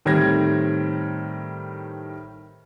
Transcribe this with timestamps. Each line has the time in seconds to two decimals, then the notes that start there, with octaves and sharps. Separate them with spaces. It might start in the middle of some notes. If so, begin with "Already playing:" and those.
0.05 A2 D#3 G3 C4 G#6 A#6